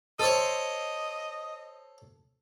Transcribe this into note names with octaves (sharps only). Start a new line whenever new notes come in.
A4 C5 C#5 D#5